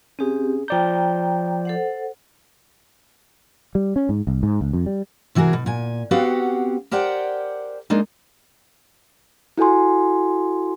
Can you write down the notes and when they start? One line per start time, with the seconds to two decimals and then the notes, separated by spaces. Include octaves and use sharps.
0.19 C4 C#4 G4 G#4
0.68 F3 D5 G5 A#5 G6
1.65 A4 C5 F#5
3.75 G3
3.96 C#4
4.09 G#2
4.27 C2
4.43 G#2
4.61 C#2
4.73 F2
4.86 G3
5.35 C3 E3 F#4 G#4 A#4
5.53 B2
5.66 A#2 G#5
6.11 B3 C4 F#4 G4 F5 F#5
6.91 G4 A#4 C5 D5 F#5 G5
7.90 G#3 A#3 D4 D#4
9.58 E4 F#4 A4 G#5 C6